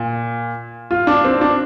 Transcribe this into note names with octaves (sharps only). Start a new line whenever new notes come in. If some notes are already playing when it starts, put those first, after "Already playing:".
Already playing: A#2
F4
D4
C4
D4